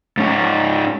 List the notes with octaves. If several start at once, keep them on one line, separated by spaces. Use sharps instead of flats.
G#2 C#4